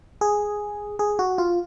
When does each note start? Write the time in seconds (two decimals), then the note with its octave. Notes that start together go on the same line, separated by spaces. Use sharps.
0.21 G#4
0.99 G#4
1.19 F#4
1.38 F4